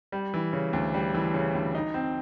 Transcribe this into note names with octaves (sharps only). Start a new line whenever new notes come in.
G3
E3
C#3
D2
G3
E3
C#3
D2
D#4
C4